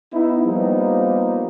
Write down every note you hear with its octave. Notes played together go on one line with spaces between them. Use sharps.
B3 D#4 E4
F3 G3 A#3 B3 D#4